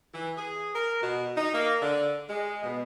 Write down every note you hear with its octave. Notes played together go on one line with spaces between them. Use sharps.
E3
G#4
A#4
B2
D#4
A#3
D3
G#3
B2